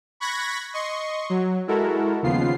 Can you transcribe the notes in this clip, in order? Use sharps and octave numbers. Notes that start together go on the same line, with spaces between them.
B5 C#6 F#6 G#6 A#6 B6
D#5 C6 C#6
F#3
G#3 E4 F#4 A4 A#4
D#2 C#3 F3 B3 F4 C7